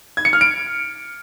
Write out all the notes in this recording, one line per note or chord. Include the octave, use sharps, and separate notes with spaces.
G#6
C#7
F6
D7